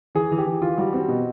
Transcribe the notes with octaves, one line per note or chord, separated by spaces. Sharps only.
E3 G#4
E3
G4
E3
E3 F4
G3 F#4
C4 F#4
B2